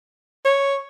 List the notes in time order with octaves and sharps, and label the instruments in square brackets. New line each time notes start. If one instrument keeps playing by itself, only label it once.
[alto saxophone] C#5